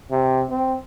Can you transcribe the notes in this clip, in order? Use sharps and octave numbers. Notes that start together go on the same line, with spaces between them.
C3
C4